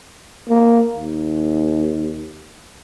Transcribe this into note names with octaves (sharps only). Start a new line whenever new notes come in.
A#3
D#2